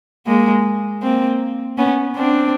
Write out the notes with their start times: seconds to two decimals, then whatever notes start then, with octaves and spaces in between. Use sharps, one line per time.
0.26 G#3 A#3
1.02 A#3 C4
1.78 B3 C#4
2.16 C4 D4